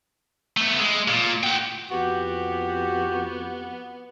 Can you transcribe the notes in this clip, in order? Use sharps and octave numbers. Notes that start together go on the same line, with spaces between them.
A3 B3
G#3
A#2
F#4 G5
F2 B3 F#4 G4